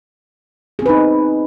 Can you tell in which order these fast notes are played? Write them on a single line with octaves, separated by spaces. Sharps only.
G#4 C4 B4 D#4